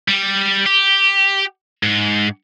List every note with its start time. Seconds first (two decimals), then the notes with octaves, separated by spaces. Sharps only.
0.08 G3
0.66 G4
1.83 G#2